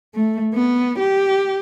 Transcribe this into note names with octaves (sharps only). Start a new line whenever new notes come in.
A3
B3
G4